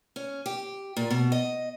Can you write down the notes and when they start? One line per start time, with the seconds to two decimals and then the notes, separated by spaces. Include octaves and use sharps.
0.16 C#4
0.46 G4
0.97 A#2
1.10 B2
1.32 D#5